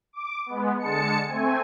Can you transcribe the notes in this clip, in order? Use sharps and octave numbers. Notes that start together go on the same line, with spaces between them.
D6
G#3 B3
D3 G#3 A5 C#7
A3 C4 G#5